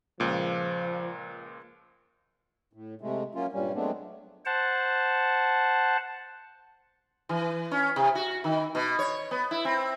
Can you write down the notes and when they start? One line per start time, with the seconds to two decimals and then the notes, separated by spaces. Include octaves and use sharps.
0.20 C#2 A#2 F3
2.73 A2
3.01 C3 G#3 A3
3.35 F#3 A#3 C#4 F4
3.53 G2 A#2 G3 C#4
3.74 F#3 G#3 A3 B3 C4 D4
4.46 C5 F#5 A5
7.29 E3
7.71 C#4
7.96 C3
8.15 F#4
8.44 D#3
8.75 B2
8.99 C#5
9.31 B3
9.51 E4
9.65 C4